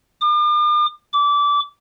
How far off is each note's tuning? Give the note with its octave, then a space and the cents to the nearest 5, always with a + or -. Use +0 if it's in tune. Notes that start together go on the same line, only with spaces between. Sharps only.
D6 +45
D6 -20